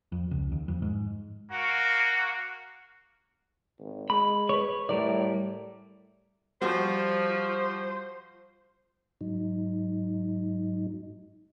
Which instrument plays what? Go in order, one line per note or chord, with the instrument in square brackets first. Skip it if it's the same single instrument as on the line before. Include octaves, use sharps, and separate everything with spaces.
[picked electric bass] F2
C#2
D#2
F2
G#2
[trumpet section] A#3 F#4
[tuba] G#1
[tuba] G#3 [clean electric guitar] B5
[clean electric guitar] B4 C#5
[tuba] A2 [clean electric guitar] G3 A#4 D5
[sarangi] F3 [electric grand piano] G3 F#4 [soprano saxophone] C5
[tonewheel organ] G#2 F#3 D#4